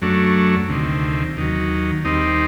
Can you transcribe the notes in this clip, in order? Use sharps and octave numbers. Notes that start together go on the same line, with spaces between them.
F#2 F#3 A3 D4
D2 C3 D#3
D#2 D#3 F#3
D#2 D#3 G3 C4 D#4